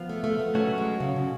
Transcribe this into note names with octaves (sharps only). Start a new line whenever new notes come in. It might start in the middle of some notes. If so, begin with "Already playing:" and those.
Already playing: F3 B3 F4
A3
A3
B3
F#3 A3 C#4 F#4 C#5
G#3
C#3
B2